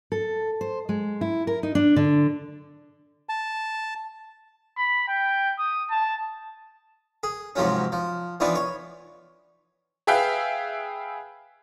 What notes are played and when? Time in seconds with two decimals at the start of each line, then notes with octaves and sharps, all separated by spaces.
0.12 A4
0.61 C5
0.89 G#3
1.21 E4
1.47 A#4
1.63 D#4
1.75 D4
1.96 D3
3.29 A5
4.77 B5
5.08 G5
5.59 D#6
5.90 A5
7.23 G#4
7.56 G#2 C3 F3 F#3 C#4
7.92 F3
8.40 E3 F3 B3 D4 D#4
8.55 C#5
10.07 G#4 B4 E5 F5 G5